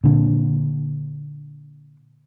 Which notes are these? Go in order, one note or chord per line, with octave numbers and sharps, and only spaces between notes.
A#2 D3